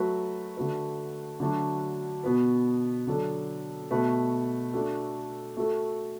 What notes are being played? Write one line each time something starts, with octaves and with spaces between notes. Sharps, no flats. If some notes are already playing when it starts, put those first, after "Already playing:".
Already playing: F#3 A3 F#4 B4
D3 A3 F#4 B4
D3 F#3 A3 D4 F#4
B2 B3 F#4 B4
D3 F#3 D4 A4
B2 A3 F#4 B4
A3 D4 F#4 A4
A3 F#4 A4